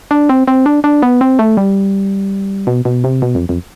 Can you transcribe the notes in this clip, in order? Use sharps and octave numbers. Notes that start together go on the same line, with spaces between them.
D4
C4
C4
D4
D4
B3
C4
A3
G3
B2
B2
C3
B2
F2
F2